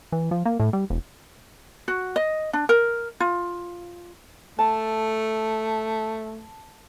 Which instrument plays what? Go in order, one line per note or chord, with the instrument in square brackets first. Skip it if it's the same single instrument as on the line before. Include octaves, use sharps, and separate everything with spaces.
[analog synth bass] E3
F3
A#3
A2
G3
E1
[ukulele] F#4
D#5
D4
A#4
F4
[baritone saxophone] A3 [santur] A5